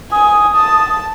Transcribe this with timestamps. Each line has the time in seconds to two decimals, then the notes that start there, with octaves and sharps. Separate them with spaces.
0.12 G#5 D#6
0.56 A5